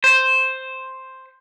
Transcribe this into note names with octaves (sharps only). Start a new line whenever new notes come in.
C5